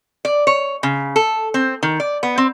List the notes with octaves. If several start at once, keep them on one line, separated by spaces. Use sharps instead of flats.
D5
C#5
C#3
A4
C4
D#3
D5
B3
C4